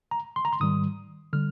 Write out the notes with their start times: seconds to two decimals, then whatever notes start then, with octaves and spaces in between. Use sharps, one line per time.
0.11 A#5
0.36 C6
0.45 A#5
0.53 C6
0.60 G#2 D#3 G3 D#6
1.33 D3 G3 F6